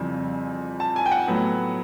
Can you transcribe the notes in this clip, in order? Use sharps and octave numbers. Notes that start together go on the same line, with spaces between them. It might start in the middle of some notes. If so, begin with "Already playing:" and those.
Already playing: F2 C#3 E3 G3 C4
A5
G#5
G5
F#5
A2 F#3 B3